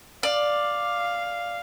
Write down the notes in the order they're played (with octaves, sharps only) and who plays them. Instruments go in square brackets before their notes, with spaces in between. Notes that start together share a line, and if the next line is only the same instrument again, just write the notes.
[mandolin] D5 [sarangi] F5